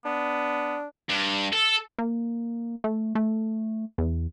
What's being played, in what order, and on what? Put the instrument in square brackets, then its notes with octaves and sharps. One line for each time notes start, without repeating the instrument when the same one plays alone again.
[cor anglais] B3 [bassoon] D4
[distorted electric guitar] G2
A4
[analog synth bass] A#3
A3
A3
E2